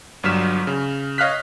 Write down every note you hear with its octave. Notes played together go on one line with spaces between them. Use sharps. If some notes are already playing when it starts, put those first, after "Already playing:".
G1 G2 F#3 F6 B6 E7
C#3
C#5 D#5 F5 F6 F#6 B6